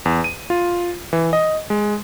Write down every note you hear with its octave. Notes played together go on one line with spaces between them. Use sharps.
E2
D#7
F4
E3
D#5
G#3